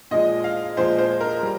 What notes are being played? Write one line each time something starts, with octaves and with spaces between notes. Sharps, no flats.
A#2 F3 G#3 D#5
F5
A#2 F3 G#3 C5
C5
A#4
G3